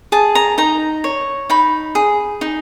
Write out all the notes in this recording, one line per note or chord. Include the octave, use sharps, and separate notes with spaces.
G#4 A5
A#5
D#4 A#5
C#5
D#4 B5
G#4
D#4